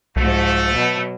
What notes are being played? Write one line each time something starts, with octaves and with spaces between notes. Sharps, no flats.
C2 G#2 F3 A3 F#4
B2 F#3